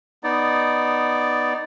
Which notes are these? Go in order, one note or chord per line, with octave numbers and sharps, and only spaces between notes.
B3 D#4 D5